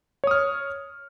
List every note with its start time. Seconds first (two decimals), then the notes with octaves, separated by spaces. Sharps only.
0.24 C#5
0.27 D#6
0.31 F6